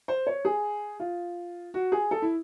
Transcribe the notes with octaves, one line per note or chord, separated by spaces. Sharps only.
C5
C#5
G#4
F4
F#4
G#4
A4
E4